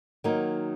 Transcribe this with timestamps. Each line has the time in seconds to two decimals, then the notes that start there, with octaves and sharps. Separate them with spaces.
0.24 D#3 F#3 A#3 D#4